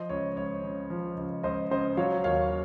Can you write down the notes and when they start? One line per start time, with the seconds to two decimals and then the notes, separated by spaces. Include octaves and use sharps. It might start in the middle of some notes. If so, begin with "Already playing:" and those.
Already playing: F3 C5 D#5
0.09 C#2 C#5
0.36 C#2 C#5
0.63 C#3
0.90 F3
1.17 C#2
1.43 C#2 C5 D#5
1.71 C#3 C5 D#5
1.97 F#3 C#5 F5
2.24 D#2 C#5 F5